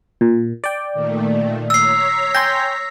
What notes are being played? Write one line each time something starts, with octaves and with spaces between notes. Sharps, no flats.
A#2
D5 G5
A#2 D#3 A3
C#5 A#5 E6 B6 C7
G5 G#5 C6 A#6